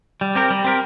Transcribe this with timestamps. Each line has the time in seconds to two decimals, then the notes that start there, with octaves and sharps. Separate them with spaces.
0.21 G3
0.35 C4 G4 A#4
0.50 G3
0.64 C4 G4 A#4